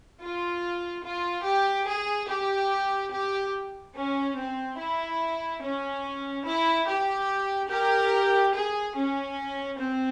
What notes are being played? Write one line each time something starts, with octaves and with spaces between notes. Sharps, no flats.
F4
F4
G4
G#4
G4
G4
C#4
C4
E4
C#4
E4
G4
G4 A#4
G#4
C#4
C4